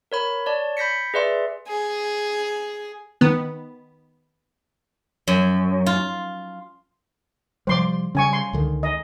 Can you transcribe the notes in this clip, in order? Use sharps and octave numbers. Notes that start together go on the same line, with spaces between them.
A#4 C#5 B5
C#5 D5 A5
B5 G6 A#6 B6 C#7
G#4 B4 D5 E5 C6
G#4
D#3 B3
F#2
F4
C3 F3 G3 C5 C6 D6
C#3 G3 C#4 G#5 C#6
C6
C#2 D3 D#3
D#5